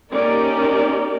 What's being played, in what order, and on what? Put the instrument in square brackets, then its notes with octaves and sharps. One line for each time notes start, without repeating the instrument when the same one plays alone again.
[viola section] A#3 C#4 D#4 G4 A#4 D5